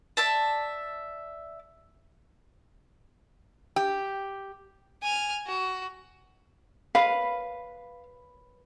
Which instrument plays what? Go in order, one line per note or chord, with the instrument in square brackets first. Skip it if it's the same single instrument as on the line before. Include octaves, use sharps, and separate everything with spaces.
[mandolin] D5 E5 A5
[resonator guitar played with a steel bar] G4
[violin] G#5 F6
F#4
[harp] B4 [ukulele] F5